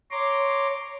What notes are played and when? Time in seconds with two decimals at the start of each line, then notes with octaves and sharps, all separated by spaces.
0.11 C#5 A#5 C6 D6